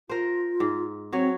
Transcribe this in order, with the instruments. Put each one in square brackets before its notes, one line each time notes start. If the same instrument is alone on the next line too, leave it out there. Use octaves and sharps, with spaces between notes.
[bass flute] F4 [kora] A#4 C5
[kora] G#2
[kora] F#3 C#5 [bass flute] C4